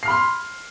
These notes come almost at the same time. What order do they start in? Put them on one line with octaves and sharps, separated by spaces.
C7 F6 B5 C6